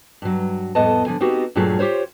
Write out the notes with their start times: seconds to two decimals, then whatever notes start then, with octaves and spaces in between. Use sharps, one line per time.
0.22 G2 F#3
0.75 F2 A2 B3 A4 D#5 A5
1.06 D3 F3 G#5
1.20 B3 C4 D#4 F#4 G4
1.55 G2 A#2 F#3 A3 F4 G#4
1.79 F4 G4 A#4 C5 C#5